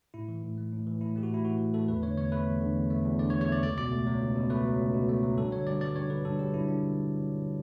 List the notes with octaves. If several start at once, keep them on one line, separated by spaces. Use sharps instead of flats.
A2 E4
E3
A2
A3
A2
E3
A2 E4
A3 G4
F#4
A2 E4
E3 F#4
A2
A3 A4
E2 B4
D3 C#5
E2 C#5
A3 B4
E2
D3
E2
A3
E2
D3 D5
C#5
E2
C#5
A3 D5
C#2 D5
B2 D5
A3
F#3
C#2
B2
A3 B4
F#3
C#2
B2
A3
F#3
G2 A4
D3 C#5
G2 D5
G3 D5
G2 C#5
D3 B4
G2 A4
G3 G4
G2 E4
D3 D4